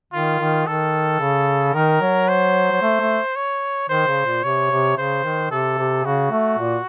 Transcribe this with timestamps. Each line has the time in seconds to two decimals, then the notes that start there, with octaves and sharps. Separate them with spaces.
0.13 D#3 F4
0.40 D#3
0.66 D#3 A4
1.20 C#3
1.74 D#3 A#4
2.01 F#3
2.28 C5
2.71 F#3
2.82 A3
3.00 A3
3.36 C#5
3.89 D#3 C5
4.07 C#3
4.25 A#2
4.43 C3 C#5
4.71 C3
4.97 C#3 C5
5.24 D#3
5.51 C3 A4
5.78 C3
6.05 C#3 F#4
6.31 A3
6.58 A#2